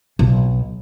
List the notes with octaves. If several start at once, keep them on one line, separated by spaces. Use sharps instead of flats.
B1